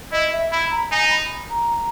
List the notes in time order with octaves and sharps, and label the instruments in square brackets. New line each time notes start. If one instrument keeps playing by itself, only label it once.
[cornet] E4 [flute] D#5
[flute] E5
[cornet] E4 [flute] B5
[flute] A#5
[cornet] D#4 [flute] G#5
[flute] B5
A#5